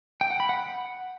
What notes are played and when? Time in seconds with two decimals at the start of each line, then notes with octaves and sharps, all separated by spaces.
0.21 G5
0.30 F#5
0.40 B5
0.49 F#5